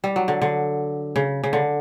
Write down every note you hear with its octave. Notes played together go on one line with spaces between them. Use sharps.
G3
F#3
D3
D3
C#3
C#3
D3